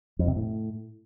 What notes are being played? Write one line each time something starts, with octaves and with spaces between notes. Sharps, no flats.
F2
C3
A2